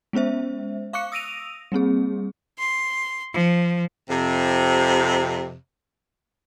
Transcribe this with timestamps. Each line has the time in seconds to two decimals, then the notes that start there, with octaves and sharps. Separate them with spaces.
0.13 G#3 B3 C#4 C5 E5
0.93 F5 C#6 D6 F#6 C#7
1.12 D#6 E6 A#6 D7 D#7 F7
1.72 G3 A#3 C4 G#4
2.57 C6
3.34 F3
4.10 F2 C3